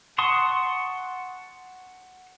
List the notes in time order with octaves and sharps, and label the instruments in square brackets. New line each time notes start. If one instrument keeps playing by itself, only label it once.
[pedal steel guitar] F#5 A5 C6 C#6 D#6